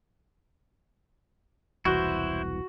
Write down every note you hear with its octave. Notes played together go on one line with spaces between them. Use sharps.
E1 C2 E3 E4 F#4 C5